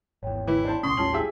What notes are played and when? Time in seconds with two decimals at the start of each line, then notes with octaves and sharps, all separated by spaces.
0.23 G#1 E2 C#5 G5
0.47 E3 E4
0.65 D4 C5 A5
0.83 C#2 B2 C#4 C6 C#6 D#6
0.97 A1 D#2 G3 C#4 F4 A5 F#7
1.13 G4 G#4 E5